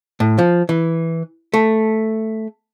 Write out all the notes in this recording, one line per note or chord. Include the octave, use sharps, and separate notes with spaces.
A2
F3
E3
A3